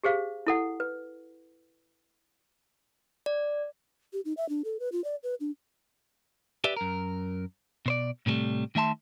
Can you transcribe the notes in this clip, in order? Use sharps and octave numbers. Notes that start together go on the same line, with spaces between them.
G4 G#4 C5 F5
E4 A4 F#5
B4
D5
G4
D#4
E5
D4
A4
B4
F4
D5
B4
D4
G4 B4 D5 E5
F#2 A#4
B2 C5 D5
A2 C3 D#3 G3 A3
D#3 A3 E5 A5 C6